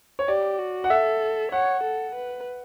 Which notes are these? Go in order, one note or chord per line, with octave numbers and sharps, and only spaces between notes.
C#5
G4 D5
F#4
F#5
A4 E5
C#5 F#5
A4
B4